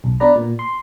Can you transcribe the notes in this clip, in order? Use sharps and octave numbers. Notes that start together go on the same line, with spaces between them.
B1
B3 D4 B4 D5 A#5
A#2
C6